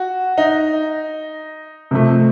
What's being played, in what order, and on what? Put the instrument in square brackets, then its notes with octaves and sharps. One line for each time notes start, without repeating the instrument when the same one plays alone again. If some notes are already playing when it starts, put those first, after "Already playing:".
Already playing: [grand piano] F#4
D#4
[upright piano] C3 F3 A3